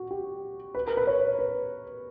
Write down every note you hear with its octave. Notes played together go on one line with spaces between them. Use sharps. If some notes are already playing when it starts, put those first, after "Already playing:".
Already playing: F#4
G4
B4
A#4
B4
C#5
B4